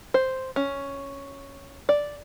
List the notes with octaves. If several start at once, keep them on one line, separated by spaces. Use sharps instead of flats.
C5
C#4
D5